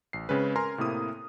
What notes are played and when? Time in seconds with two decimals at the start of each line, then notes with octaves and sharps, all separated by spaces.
0.13 A1 C7
0.29 C#3 G#3 C4 C#4 B4
0.56 A#4 G#5 A#5 C6 F6
0.78 A2 C3 A#3 E4 D#6